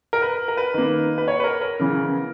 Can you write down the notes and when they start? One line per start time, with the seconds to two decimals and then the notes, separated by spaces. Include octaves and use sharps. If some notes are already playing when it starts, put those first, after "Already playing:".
0.13 A#4
0.22 B4
0.48 A#4
0.57 B4
0.74 D#3 A#3
1.18 B4
1.28 C#5
1.40 B4
1.44 A#4
1.61 A#4
1.79 C#3 E3 B3